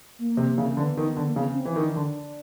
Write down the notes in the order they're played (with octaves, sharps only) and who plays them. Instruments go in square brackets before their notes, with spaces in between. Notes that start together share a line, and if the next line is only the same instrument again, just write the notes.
[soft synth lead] A#3
[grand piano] C3
C#3
[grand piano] D3 [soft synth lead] B3
[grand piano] D#3
D3
[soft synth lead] A#3
[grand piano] C#3 [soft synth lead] B3
[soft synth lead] C4
[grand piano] E3
D#3
[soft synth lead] D4
[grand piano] D3 [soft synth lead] D4